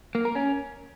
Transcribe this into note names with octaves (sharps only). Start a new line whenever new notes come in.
A#3
A#4
C#4